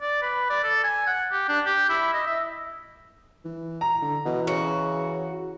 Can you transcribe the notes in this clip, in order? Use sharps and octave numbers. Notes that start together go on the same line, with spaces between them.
D5
B4
D5
A4
G#5
F#5
G4
D4
G4
E4
D#5
E5
E3
A#5
D3
B2 E3
C#3 F#4